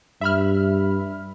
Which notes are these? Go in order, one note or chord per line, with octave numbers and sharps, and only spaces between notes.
G2 E5 B5 F6